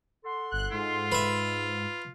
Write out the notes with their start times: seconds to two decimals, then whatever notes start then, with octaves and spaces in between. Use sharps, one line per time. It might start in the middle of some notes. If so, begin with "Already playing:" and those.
0.25 A4 F#5 C6
0.50 G1 F#6
0.72 G#2 F4
1.12 B4 E5